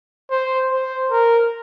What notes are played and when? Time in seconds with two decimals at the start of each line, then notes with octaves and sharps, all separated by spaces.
0.31 C5
0.71 C5
1.11 A#4